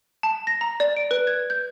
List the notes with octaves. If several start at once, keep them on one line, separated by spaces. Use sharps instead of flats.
A5
A#6
A#5
D5
D7
B4
G#6
G6